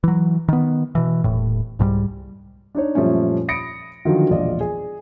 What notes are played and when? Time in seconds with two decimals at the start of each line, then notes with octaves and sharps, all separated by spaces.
0.04 E3 F#3
0.48 D#3 B3
0.95 B2 E3
1.24 D#1 A2
1.79 C2 G#2 F#3 G3
2.75 D4 D#4 C#5
2.95 F#2 A#2 F3 G3 A3 C#4
3.48 B5 D#6 A#6 C#7 D7
4.05 D3 D#3 F3 F#3 F4
4.30 E1 A#1 F4 D5 D#5
4.60 G#4